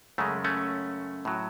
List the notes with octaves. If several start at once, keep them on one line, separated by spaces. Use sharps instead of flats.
F#2 C#3 G#3 A3
A3 C#4
A2 F#3